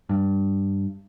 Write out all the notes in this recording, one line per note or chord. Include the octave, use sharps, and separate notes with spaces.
G2